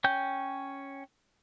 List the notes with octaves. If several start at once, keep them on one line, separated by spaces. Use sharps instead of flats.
C#4 G5 G6